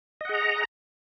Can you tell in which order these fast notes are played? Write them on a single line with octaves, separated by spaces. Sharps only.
D#5 F#5 G#4 A#5